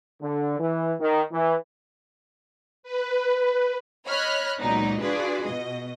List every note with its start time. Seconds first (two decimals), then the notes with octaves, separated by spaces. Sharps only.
0.21 D3
0.59 E3
1.00 D#3
1.31 E3
2.83 B4
4.07 C#5 D#5 B5 F6 F#6
4.60 C#2 A#2 F#3 B3 D#4 D5
5.01 D4 F4 F#4 G#4 B4 D5
5.45 B2 D#5